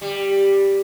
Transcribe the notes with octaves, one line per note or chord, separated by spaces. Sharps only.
G3